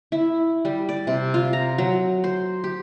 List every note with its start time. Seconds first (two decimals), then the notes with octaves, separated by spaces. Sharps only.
0.12 E4
0.65 G3
0.89 D5
1.07 C3
1.34 F4
1.53 A#5
1.78 F#3
2.24 C5
2.64 G4